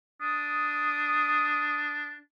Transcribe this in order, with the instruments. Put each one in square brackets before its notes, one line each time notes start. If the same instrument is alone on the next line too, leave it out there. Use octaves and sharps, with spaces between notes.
[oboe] D4 [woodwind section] D#6